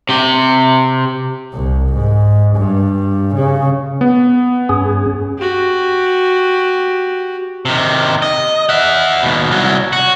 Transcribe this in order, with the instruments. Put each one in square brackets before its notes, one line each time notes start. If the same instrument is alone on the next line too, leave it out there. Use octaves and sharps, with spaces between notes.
[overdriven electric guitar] C3 G4
[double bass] C2
G#2
G2
C#3
[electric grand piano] B3
[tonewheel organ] G2 C#4 G#4
[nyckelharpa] F#4 G4
[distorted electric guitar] C3 D#3
D#5
E5 F#5
D#2 B2
C2 F#3
F#4